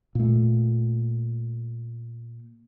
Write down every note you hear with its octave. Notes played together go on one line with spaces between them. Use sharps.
A#2 A3